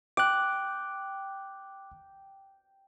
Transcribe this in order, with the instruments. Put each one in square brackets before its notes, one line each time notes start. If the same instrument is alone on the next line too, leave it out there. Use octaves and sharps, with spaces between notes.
[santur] G5 [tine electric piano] D6 F#6